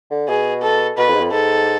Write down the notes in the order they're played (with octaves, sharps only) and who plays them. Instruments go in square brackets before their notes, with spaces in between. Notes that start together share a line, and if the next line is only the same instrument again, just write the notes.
[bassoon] D3
[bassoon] B2 [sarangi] G#4
[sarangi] A4
[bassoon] B2 [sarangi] B4
[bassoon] F2
G#2
F2
[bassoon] G#2 [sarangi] A4